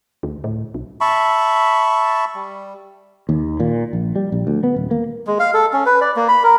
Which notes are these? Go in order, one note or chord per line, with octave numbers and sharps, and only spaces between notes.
D2
A2
B1
E5 A5 B5 C#6
G3
D#2
A#2
A#1
G3
A#1
D2
B3
D#1
A#3
G#3
F5
A4
C#4
B4
D5
A#3
B5
A#4